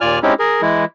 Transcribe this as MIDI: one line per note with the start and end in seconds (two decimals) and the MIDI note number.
0.01 0.19 39
0.01 0.19 46
0.01 0.19 65
0.01 0.19 74
0.01 0.19 80
0.01 0.19 89
0.23 0.34 56
0.23 0.34 60
0.23 0.34 61
0.23 0.34 63
0.23 0.34 64
0.23 0.34 67
0.39 0.62 68
0.39 0.62 70
0.62 0.85 52
0.62 0.85 56
0.62 0.85 64